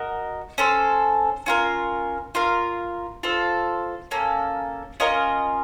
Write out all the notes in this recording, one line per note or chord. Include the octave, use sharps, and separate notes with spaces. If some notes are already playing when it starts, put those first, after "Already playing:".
Already playing: F#4 A#4 D#5
C#4 A4 C5
C#4 F4 A#4
F4 A#4 F5
F4 A4 C5
A#3 C#4 A4
C#4 F4 A#4 D#5